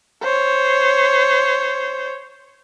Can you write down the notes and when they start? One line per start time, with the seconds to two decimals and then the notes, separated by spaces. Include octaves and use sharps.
0.23 C5 C#5